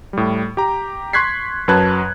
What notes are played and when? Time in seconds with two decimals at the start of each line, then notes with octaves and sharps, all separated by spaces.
0.13 A2 G3
0.57 G4 A#5
1.13 C6 C#6 F#6 G#6 B6 C7
1.68 F#2 F#3 B4 A5 F#6 G#6